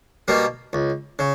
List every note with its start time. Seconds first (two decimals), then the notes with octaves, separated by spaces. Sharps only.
0.28 B2 G3 A#3
0.73 C#2
1.19 C#3